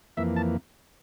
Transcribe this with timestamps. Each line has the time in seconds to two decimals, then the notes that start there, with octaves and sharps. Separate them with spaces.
0.17 F2 E3 A#3 E5
0.36 A5